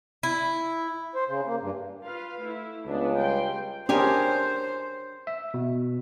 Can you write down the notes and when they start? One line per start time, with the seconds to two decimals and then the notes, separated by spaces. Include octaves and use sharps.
0.23 E4
1.15 C5
1.28 C#3
1.47 A#3
1.61 G2
2.03 F4 B4 F5
2.39 A3 E4
2.87 C#2 B3 D4
3.18 G3 G5 C6
3.89 C#4 D4 G4 G#4 A#4 C5 C#5 G#5
5.27 E5
5.54 B2